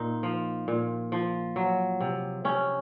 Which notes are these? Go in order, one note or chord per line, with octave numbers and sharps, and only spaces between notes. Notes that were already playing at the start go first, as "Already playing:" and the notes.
Already playing: A#2 D#4
F3
A#2
F3
F#3
C3
C3 C#4